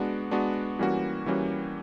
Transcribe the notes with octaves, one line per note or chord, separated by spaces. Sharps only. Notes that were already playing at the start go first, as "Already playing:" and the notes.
Already playing: G#3 B3 D4 F#4
G#3 B3 D4 F#4
E3 G3 A#3 C#4 F#4
E3 G3 A#3 C#4 F#4